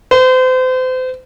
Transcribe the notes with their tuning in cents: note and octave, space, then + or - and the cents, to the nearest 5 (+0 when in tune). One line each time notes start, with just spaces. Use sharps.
C5 -35